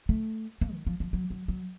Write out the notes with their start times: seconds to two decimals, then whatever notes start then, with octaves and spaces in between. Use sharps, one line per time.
0.09 A3
0.61 A#3
0.73 D#3
0.87 F3
1.00 F3
1.13 F#3
1.30 F#3
1.48 F#3